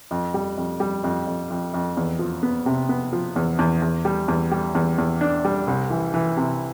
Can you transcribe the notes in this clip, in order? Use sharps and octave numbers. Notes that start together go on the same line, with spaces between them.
F2
G3
F2
G3
F2
F2
F2
F2
E2
F3
B3
C3
B3
F3
E2
E2
E2
G3
E2
G3
E2
E2
D4
G3
C2
E3
E3
C3